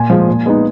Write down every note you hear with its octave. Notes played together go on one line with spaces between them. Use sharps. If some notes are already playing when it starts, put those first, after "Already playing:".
Already playing: A#2 G#5
F3 G#3
A#2
G#3 B3 D#4